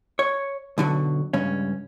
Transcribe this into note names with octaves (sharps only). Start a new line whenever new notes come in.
C#5
B1 D3 F#3
C#2 G2 C#4